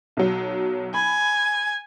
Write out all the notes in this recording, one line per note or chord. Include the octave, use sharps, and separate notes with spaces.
B1 F#3
G#5 B5